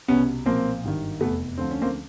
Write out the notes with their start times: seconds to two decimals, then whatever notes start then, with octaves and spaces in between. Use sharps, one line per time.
0.08 C2 B2 B3 C#4
0.46 B1 A#2 F3 A#3 C4
0.84 G#1 G2 D#3
1.20 F1 E2 C3 A3 B3
1.58 D2 D3 F3 C4
1.71 C#4
1.82 A#3 C4